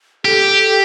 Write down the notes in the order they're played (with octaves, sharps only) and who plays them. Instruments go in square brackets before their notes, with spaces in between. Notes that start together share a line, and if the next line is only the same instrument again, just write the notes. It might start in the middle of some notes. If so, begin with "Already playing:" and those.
[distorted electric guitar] G4 [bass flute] A4